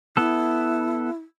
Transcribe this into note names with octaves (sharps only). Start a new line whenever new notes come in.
B3 E4 A4